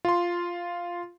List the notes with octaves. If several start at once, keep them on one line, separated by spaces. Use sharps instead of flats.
F4 C6